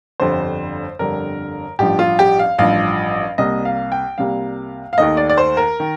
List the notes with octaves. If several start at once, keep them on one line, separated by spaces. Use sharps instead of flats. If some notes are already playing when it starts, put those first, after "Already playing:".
G1 F2 D3 G3 C5
G1 F2 D3 G3 A#4
A1 G2 F3 G4
F4
G4
F5
A1 G2 F3 F5
C2 C3 G3 A#3 D#5
F5
G5
C2 C3 G3 A#3 F5
F5
D#2 D#3 A3 D#5
D5
D5
C5
A#4
D#3